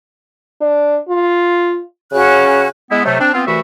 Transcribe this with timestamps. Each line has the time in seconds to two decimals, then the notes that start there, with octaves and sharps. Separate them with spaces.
0.61 D4
1.09 F4
2.12 C#3 C#4 F#4 F#6
2.90 G#3 B3 E4
3.05 C3 F#3 A3
3.19 C4 D4
3.34 B3 C4 F4
3.47 C2 E3 A3 F#4 E5 B5